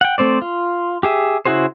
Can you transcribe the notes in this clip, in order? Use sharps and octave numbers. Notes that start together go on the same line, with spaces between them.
F#5 G5
A3 C4 C5 D5
F4
G4 G#4 E5
C#3 E4 F#4 G#4 C5